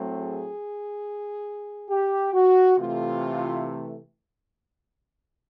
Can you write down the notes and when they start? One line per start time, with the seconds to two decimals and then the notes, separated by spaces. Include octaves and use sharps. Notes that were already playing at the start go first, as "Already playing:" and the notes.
Already playing: A2 F#3 A3 C4
0.18 G#4
1.90 G4
2.34 F#4
2.77 C3 E3 A3 F4